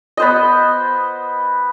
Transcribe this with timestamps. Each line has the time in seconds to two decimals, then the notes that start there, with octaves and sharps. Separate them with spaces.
0.17 B3 C5 D#5